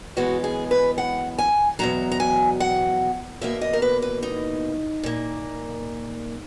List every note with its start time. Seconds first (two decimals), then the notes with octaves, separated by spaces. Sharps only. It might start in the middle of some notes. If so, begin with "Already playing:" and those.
0.17 F#2 E3 G#3 B3 F#4
0.44 G#4
0.71 B4
0.98 F#5
1.38 G#5
1.79 E2 B2 F#3 A#5
2.12 A#5
2.20 G#5
2.60 F#5
3.41 E2 B2 A#3 E5
3.61 D#5
3.73 A#4
3.82 B4
4.02 B4
4.23 D#4
5.03 A#2 A#3